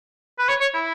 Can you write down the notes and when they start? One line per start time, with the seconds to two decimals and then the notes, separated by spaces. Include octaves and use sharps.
0.39 B4
0.49 C#5
0.61 C#5
0.74 E4